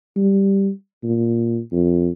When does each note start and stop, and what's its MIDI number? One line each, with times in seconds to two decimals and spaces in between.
0.16 0.70 55
1.03 1.60 46
1.72 2.09 41